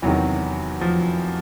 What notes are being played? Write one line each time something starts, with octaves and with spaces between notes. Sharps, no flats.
E2 C3 D#3 F#3
F3